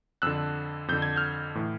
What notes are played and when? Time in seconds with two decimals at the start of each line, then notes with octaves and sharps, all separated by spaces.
0.22 F2 D3 E6 F#6
0.88 F2 D3 G6
1.02 G#6
1.16 F6 G6
1.55 A2 E3